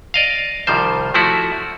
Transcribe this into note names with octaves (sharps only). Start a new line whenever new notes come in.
D5 D#5 F5
C2 D#3 F3 G3 C5
F3 A3 E4 F#4